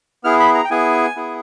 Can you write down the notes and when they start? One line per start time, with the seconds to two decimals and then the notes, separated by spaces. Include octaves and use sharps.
0.24 B3 E4 G#4 F6
0.39 B5
0.55 A#5
0.65 G5
0.70 B3 E4 G#4 G#5
1.16 B3 E4 G#4